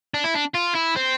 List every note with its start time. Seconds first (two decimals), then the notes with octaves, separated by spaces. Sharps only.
0.14 D4
0.24 E4
0.34 D4
0.54 F4
0.75 E4
0.96 C4